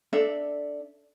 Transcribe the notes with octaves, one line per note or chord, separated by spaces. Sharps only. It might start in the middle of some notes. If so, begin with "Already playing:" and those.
D4 A4 D5 E5